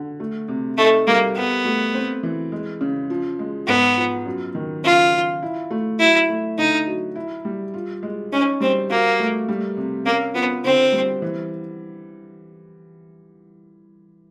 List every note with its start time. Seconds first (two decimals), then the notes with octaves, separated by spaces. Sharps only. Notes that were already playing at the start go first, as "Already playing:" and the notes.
Already playing: D3
0.20 A3
0.48 C3
0.78 A3 D#4
1.07 G3 A#3
1.36 B3 G4
1.65 A3
1.94 C4
2.23 E3
2.52 G#3
2.81 C#3
3.10 F3
3.39 G#3
3.67 G#2 B3
3.97 F3
4.26 F#2
4.55 D#3
4.84 C#3 F4
5.13 F3
5.43 E4
5.71 A3
5.99 F#3 E4
6.30 A3
6.58 D3 D#4
6.86 F#3
7.16 E4
7.45 G3
7.74 F4
8.03 G#3
8.32 C#4 D#4
8.60 G3 C4
8.90 A#3 F#4
9.20 A3
9.48 G3
9.77 C3
10.06 A#3 C#4
10.34 F3 B3
10.64 D3 C4
10.93 G3
11.22 E3